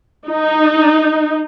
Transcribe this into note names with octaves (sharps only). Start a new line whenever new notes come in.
D#4